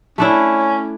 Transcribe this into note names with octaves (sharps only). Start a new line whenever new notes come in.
A3 C#4 D4 E4